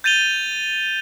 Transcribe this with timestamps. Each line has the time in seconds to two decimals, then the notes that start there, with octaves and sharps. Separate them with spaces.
0.04 G6 A6 D#7 F7 G7